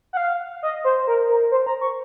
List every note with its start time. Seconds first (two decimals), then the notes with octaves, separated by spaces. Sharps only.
0.13 F#5
0.17 F5
0.63 D#5
0.84 C5
1.07 A#4
1.29 A#4
1.51 C5
1.66 A#5
1.81 C#6